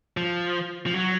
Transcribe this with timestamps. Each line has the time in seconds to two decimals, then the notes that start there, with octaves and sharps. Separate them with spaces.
0.17 F3
0.86 F3
0.94 F#3